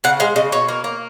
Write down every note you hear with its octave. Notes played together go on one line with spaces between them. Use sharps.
C#3 F#5
G#3 F5
C#3 D#5
B2 C#5
A#3
A#3